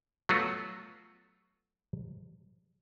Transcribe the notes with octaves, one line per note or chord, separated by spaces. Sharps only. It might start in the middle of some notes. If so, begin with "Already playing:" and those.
F#3 A3 B3 F4 F#4